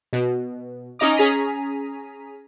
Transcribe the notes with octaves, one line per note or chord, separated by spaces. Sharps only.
B2
C#4 D#4 D#5 A#5 D6
C#4 G#4 A#5 B6 D#7